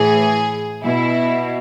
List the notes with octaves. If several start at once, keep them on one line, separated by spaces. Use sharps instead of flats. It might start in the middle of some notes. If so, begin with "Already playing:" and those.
Already playing: A2 E3 G#4
B2 E4